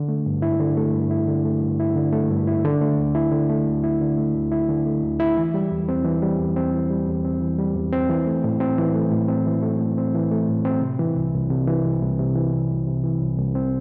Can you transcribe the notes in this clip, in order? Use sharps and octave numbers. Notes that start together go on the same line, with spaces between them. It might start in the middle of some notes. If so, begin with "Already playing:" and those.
Already playing: D3
A3
G2
E4
D3
A3
G2
E4
D3
A3
G2
E4
D3
A3
G2
E4
D3
A3
D2
E4
D3
A3
D2
E4
D3
A3
D2
E4
D3
A3
D2
E4
E3
G3
E2
C4
E3
G3
E2
C4
E3
G3
E2
C4
E3
G3
E2
C4
E3
A3
A2
C4
E3
A3
A2
C4
E3
A3
A2
C4
E3
A3
A2
C4
C3
E3
C2
C2
C3
E3
C2
C2
C3
E3
C2
C2
C3
E3
C2
C2
C4